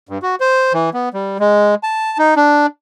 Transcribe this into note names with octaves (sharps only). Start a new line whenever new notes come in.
G2
F#4
C5
E3
B3
G3
G#3
A5
D#4
D4